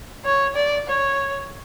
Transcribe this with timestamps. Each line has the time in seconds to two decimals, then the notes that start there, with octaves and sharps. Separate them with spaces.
0.25 C#5
0.56 D5
0.88 C#5